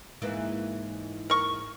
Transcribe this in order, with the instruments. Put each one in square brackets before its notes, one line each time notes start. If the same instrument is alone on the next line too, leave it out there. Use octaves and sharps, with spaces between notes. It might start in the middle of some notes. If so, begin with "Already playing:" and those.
[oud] G#2 E3 A#3
[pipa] A#4 C#6